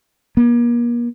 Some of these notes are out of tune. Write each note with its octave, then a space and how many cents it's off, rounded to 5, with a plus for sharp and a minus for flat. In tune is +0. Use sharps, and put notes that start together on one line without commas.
A#3 +40